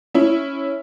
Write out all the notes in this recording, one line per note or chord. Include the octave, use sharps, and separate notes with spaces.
C#4 E4